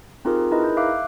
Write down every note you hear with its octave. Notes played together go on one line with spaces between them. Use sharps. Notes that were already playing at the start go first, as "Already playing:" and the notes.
C4 D#4 F4 G4 G#4 A#4
D#4 E4 G#4 A#4 B4 D#5
G6
E5 F5 D6 F#6